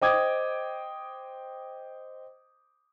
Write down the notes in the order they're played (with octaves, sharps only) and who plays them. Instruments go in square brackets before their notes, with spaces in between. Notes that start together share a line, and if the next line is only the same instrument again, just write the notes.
[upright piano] C5 D#5 G5 D6 D#6 G#6